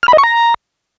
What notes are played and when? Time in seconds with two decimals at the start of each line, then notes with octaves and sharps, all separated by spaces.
0.03 F6
0.08 B5
0.13 D#5
0.18 C#6
0.23 A#5